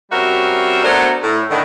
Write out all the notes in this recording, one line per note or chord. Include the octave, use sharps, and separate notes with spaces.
G3 C4 C#4 F#4 A#4 E5
F#3 A3 B3 D4 A#4 C5
A2
A2 D3 D#3